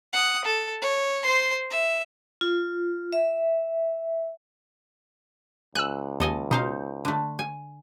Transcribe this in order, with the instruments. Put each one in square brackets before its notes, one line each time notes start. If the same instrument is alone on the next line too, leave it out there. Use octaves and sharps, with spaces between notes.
[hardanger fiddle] F#5 D#6
A4
C#5
C5 C6
E5
[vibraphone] F4
E5
[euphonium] C#2 [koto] G#5 [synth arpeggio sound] E6 F#6
[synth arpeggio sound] D#2 [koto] A4 D#5 G#5
[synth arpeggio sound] B2 [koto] D#4 C5 F5
[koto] D3 A3
G#5